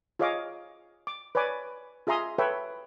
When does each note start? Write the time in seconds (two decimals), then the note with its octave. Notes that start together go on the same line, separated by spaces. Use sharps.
0.19 F4 G#4 C#5 D#5 F5 D6
1.07 D6
1.35 B4 C#5 D5 G#5 D6
2.07 F4 G#4 E5 A#5 C6 D#6
2.38 A4 B4 C#5 E5 G5